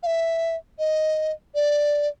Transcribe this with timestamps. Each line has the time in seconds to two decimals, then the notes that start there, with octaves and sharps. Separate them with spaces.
0.03 F5
0.06 E5
0.79 D#5
1.55 D5